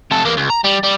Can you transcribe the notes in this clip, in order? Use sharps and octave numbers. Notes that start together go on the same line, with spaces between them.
C3 A4
E2 A#3
C#2
A#5
G3
G3